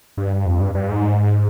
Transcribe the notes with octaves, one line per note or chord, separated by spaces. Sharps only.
G2
F2
G2
G2
G#2